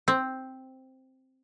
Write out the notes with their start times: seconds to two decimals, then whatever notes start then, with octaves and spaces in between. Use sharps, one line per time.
0.08 C4